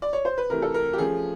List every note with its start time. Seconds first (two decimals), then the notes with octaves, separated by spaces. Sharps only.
0.02 D5
0.13 C#5
0.25 C5
0.38 B4
0.50 C3 E3 A3 C4 A#4
0.62 A4
0.74 A#4
0.93 G4
0.98 F3 A3 C#4 G#4